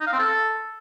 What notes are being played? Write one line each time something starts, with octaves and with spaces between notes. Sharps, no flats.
D#4
F5
C4
A4